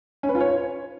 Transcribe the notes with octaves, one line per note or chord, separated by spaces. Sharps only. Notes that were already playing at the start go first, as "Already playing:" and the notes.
C#4
B4
F4
C#5